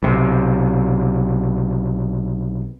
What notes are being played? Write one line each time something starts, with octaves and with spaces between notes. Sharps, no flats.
B1 C3